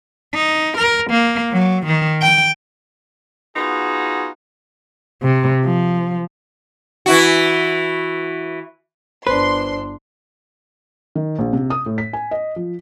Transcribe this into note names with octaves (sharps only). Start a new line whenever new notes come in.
D#4
A#4
A#3
F#3
D#3
G5
B3 D#4 F4 F#4 G#4
C3
F3
E3 E4 F#4
G1 D4 B4 C5 C6
D#3
A#1
C3
D#6
A2
B6
G#5
D#5
F3